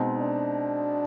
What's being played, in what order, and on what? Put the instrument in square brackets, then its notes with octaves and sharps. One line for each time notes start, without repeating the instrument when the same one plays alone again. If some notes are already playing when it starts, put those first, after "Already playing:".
Already playing: [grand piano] B2 G#3 C4 D#4
[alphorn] D4